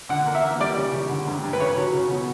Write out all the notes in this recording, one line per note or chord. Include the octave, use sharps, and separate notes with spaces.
D3 F#5
A#3
E5
A#3
G3 D5
C#3
C#3
D3
G2
G2
B4
C#3 C#5
F#3
C#3
B2